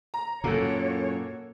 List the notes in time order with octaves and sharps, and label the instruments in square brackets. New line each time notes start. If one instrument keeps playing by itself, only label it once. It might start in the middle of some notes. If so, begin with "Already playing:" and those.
[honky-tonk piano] A#5
[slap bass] F#2 A#2 [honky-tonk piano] A#3 F#4 A4 [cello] C#5